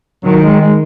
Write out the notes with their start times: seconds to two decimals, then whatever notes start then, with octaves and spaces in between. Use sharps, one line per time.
0.25 D#3 F#3
0.43 G#3
0.61 G#3